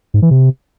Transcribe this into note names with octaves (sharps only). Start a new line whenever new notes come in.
G#2
E3
C3